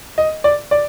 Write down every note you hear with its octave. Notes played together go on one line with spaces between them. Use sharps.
D#5
D5
D5